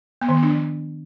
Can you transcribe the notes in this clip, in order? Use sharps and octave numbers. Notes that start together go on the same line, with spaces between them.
B3
D#3
B3
D4
F3